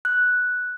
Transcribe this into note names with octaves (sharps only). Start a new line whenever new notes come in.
F#6